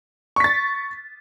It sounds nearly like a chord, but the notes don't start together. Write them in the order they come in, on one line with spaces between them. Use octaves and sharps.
C#6 B6 A6